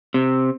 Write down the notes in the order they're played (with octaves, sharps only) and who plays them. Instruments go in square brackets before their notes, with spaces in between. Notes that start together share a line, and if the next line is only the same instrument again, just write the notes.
[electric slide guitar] C3